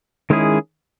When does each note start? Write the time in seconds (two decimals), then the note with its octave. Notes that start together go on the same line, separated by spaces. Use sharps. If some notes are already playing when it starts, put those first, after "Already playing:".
0.30 D#3 G#3 C#4 E4 G#4